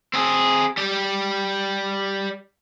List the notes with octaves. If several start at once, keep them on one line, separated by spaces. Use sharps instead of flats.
C4 G#4
G3 G4